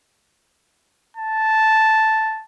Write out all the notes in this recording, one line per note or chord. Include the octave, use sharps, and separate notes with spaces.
A5